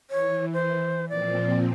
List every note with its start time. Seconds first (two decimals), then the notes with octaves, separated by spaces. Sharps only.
0.10 E3 C#5
0.53 C5
1.09 A#2 F3 C4 D5